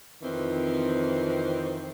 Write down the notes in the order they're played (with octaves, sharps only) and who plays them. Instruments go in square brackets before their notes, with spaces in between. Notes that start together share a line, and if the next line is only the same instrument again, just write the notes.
[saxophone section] F2 D#3 E3 C4